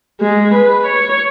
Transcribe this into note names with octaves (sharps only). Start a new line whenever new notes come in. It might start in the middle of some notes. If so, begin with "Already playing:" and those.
G#3
B4
C#5